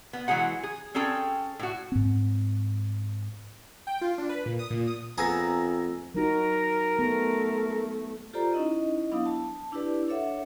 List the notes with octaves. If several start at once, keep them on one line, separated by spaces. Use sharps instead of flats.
B3
E3 F#3 G#3 G#4 F#5
G#4
C4 C#4 G#4 A4 G5
A2 F#4
G#2 C4
G5
F4
D4
B4
A#2
D#6
A#2
D#6
F2 B3 G#4 G#5 A#5 E6 A#6
F#3 D#4 F#4 A#4
A3 B3
F4 G4 A4 C5 D5 A#5
C#4 D#4 E4 D#5
F#3 B3 D4 E4 F5 D#6
A5
D4 E4 G4 B4 D5
D4 A4 C#5 E5 F#5